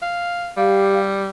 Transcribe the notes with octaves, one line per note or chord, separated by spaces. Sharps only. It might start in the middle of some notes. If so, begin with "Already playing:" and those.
F5
G3 G4 F5